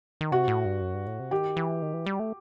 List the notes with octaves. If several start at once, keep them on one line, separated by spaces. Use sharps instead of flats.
D#3
C3 F#4
A2
G2
F#2
G2
A2
C3
D#3 G4
E3
D#3
E3
G3
A3